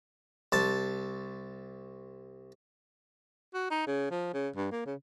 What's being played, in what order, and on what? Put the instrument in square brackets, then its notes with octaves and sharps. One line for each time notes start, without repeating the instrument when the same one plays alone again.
[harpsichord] C2 A5
[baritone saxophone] F#4
D#4
C#3
F3
C#3
G2
A#3
C#3